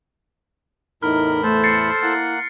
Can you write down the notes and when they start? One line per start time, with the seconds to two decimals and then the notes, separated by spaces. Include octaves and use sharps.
1.03 E2 A2 D#4 A#4 B5 F6
1.43 A3 A4 C5
1.64 A6 C7 C#7
2.03 A#3 E4 F#5